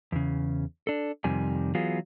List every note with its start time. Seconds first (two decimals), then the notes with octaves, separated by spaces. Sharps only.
0.12 E2 C#3
0.87 D4 A4
1.24 F2 C3 D#3 G3 G#5
1.75 E3 F#3 B3 F4 G#4